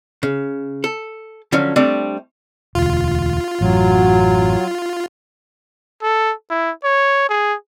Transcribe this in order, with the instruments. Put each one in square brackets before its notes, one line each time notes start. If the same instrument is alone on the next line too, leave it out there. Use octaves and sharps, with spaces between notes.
[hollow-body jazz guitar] C#3
A4
D3 F3 F#3 C#4
G3 A3 C4 D4
[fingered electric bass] E1 D2 [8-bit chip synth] F4
[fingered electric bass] A1 F#2 [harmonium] F#3
[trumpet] A4
E4
C#5
G#4